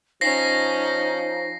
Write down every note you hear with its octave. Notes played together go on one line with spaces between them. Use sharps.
F3 C#4 D#4 A#6 C7